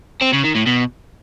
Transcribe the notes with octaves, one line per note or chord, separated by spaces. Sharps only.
C4
C#3
D#3
A2
B2